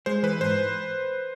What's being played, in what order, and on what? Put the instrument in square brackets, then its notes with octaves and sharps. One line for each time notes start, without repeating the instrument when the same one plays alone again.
[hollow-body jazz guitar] G#3 [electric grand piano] C5
[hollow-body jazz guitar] E3 [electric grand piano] B4
[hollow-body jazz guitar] G#2 [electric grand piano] C5